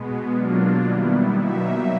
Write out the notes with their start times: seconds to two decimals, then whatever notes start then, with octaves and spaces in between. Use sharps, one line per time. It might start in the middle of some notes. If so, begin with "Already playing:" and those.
Already playing: B2 G#3 B3
0.33 B2 F#3 A#3 D4 F4
0.84 D#3 G3 B3 E4
1.34 B2 F#3 A#3 D#4 E5